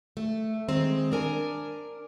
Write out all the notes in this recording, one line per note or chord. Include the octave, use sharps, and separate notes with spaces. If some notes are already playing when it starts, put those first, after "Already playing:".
A3
D#3 G#3 C4
D4 A#4 G#5